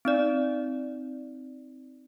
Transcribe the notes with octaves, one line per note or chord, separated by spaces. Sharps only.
C4 D#4 D5